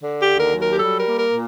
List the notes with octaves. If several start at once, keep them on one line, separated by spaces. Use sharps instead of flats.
D3
G4
D#2
A#4
F#3
A#4
G4
G3 A4
A#4
A#3
A#4
A#2